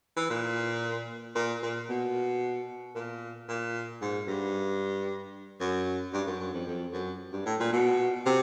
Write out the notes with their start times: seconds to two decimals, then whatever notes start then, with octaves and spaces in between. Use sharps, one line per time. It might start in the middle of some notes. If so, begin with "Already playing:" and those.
0.17 E3
0.30 A#2
1.36 A#2
1.63 A#2
1.89 B2
2.96 A#2
3.49 A#2
4.02 G#2
4.28 G2
5.61 F#2
6.14 G2
6.27 F#2
6.40 F#2
6.54 F2
6.67 F2
6.93 F#2
7.33 G2
7.46 A2
7.60 A#2
7.73 B2
8.26 C3